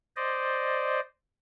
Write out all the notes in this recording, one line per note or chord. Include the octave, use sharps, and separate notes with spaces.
C5 D5 D#5